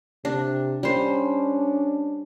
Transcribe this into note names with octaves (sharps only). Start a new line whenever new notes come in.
C3 D4
G3 C#4 D4 C5